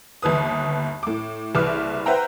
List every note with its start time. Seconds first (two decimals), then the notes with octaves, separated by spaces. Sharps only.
0.22 G1 D#2 B4 D#6
1.03 A2 D6
1.55 F#1 C2 B4 D6 F6
2.06 B4 C5 E5 F#5 G5 A#5